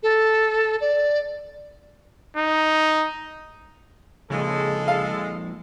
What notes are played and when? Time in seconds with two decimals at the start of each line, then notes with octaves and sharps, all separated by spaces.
0.03 A4
0.81 D5
2.37 D#4
4.30 F2 A#2 C#3 G#3 A4
4.88 F5